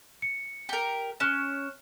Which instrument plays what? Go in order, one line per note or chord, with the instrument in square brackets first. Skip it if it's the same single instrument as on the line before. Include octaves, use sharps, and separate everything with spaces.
[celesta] C#7
[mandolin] G4 A#4
[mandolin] C#4 [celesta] F6 F#6 E7